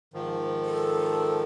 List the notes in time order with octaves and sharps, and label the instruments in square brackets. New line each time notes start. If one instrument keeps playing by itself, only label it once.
[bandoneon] G#2 D#3 F3
[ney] A4